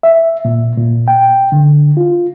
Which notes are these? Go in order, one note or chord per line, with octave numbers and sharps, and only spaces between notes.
E5
A#2
A#2
G5
D3
F4